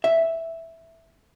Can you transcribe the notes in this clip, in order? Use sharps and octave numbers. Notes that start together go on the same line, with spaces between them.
E5